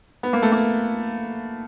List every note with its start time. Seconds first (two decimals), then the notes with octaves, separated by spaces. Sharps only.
0.23 B3
0.33 A#3
0.42 A3
0.52 A#3